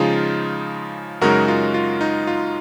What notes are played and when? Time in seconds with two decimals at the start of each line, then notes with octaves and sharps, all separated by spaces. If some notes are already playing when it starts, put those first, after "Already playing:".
Already playing: C#3 F3 G#3 D#4 F4 G#4
1.21 F#2 C#3 G#3 D#4 F#4 A#4
1.48 F4
1.74 F4
2.01 D#4
2.27 F4